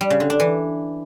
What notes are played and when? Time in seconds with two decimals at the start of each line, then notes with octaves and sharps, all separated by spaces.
0.01 G3
0.10 C#3
0.20 D3
0.30 D4
0.40 E3